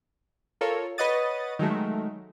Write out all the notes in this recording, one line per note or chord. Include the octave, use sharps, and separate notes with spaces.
F4 A4 A#4 C#5 F5
B4 C#5 D#5 F#5 D#6 A6
D#3 F#3 G#3 A3